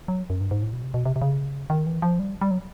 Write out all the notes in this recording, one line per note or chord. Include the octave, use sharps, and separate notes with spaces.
F#3
F#2
G2
G#2
A2
B2
C3
B2
C3
C3
C#3
D#3
E3
F3
G3
G3
F#3